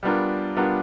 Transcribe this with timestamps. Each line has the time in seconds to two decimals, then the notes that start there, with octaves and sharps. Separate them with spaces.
0.03 G3 B3 D4 F4 A#4
0.56 G3 B3 D4 F4 A#4